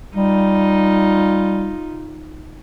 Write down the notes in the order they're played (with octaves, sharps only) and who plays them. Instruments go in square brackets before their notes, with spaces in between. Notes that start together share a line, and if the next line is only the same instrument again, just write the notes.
[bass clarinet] G3 [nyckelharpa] D#4 F4